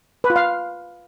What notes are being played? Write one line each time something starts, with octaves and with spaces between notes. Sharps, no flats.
B4
F4
F5